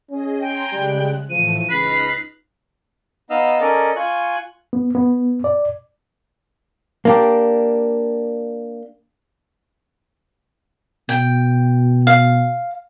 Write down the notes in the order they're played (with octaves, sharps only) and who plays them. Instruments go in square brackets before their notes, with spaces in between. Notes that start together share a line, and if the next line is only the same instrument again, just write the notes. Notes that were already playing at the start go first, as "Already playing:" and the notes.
[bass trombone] C#4 [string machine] G#4 D#5
[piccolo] G5 [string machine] G#5 A#5 C6
[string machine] C#3 G#3 F#6 [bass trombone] G3
[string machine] A2 E3 A3 [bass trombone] F3 [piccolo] D#7
[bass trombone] C#2 [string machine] D#4 F6 A#6 [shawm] B4 [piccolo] C7
[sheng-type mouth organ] B3 D#4 D#5 F5 E6 F6
C#4 A4 A#4 D5 D#5
F4 G#5 C#6 F#6
[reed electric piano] B3
B3
D5
[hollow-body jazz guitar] A#3 D4 G4
[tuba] B2 [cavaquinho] G5
[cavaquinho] F5